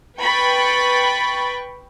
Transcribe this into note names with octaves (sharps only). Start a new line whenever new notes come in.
B4 G5 B5 C#6 A6